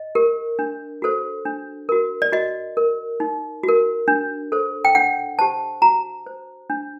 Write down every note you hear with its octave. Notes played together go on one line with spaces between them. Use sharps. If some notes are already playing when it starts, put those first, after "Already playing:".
Already playing: D#5
G4 A#4
D4
F#4 A4 C5
D4
F#4 A#4
D5
F#4 D#5
A#4
D#4
F#4
A#4
D4
A4 C5
G5
D4 F#5
G4 C5 A5
F#4 A#5
C5
D4